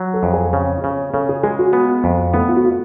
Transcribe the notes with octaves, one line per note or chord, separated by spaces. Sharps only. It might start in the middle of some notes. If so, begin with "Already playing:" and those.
Already playing: F#3
A4
F2
G#4
C#3
C#3
C#3 A4
G#4
G#3 G#4
F#4
B3
F2
A3 B3
F4
F#4
F4